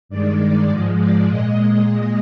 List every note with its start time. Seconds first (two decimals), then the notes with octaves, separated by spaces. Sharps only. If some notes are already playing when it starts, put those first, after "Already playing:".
0.09 G2 D#3 G#3 D5
0.68 G#2 F3 G#3 D5
0.98 D5
1.27 A#2 G#3 D#5